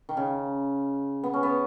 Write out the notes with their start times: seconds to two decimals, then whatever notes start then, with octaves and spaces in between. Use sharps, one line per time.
0.09 D#3
0.17 C#3
1.23 B3
1.33 C#4
1.43 B3